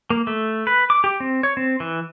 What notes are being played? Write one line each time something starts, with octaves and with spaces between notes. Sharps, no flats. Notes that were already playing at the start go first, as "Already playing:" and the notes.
A#3
A3
B4
D6
G4
C4
C#5
C4
E3